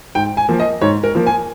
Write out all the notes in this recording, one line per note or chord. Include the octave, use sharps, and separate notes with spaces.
G#2 G5
G#5
F3 A#3
D#5
G#2 C#5
A#4
F3 A#3
G#5